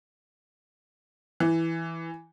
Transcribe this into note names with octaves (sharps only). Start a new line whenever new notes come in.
E3